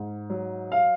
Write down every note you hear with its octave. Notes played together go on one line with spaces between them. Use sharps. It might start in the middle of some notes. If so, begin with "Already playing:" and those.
Already playing: G#2
F#3
F5